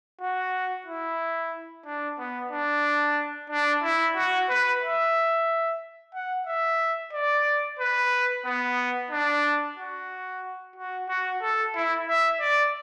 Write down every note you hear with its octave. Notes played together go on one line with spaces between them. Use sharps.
F#4
E4
D4
B3
D4
D4
E4
F#4
B4
E5
F#5
E5
D5
B4
B3
D4
F#4
F#4
F#4
A4
E4
E5
D5